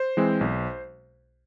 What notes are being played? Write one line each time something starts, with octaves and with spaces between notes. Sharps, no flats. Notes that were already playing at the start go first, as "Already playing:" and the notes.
Already playing: C5
E3 G#3 C4
B1